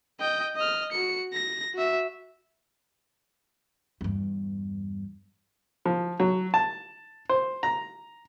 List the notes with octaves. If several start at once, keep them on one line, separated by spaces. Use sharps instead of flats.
D#5 G5
D#5 F6
F#4 C#7
A#6
F#4 E5
E2 G2
F3
F#3
A5
C5
A#5